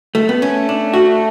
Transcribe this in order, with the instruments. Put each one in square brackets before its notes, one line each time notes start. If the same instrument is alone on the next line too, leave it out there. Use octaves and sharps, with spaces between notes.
[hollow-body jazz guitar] A3
B3
[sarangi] A3 [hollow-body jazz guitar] C#4
[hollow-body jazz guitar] D4
F#4